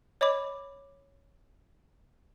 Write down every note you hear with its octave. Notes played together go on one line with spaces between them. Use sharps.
C#5 D#5 B5 D6